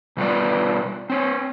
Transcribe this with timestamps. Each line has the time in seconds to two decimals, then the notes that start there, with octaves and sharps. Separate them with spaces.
0.17 B2 G3 B3 F4 B4 D5
1.10 C4 C#5